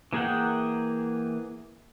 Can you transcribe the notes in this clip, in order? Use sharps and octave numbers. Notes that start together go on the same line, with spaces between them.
E3 A#3 G#4 F#5 G5